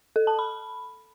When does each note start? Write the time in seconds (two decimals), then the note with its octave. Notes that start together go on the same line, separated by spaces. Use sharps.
0.16 A4
0.27 A5
0.39 B5